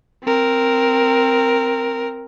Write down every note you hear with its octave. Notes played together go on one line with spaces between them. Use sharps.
C4 A#4